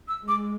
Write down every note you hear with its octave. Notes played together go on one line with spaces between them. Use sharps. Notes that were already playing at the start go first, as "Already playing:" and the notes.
E6
G#3 D6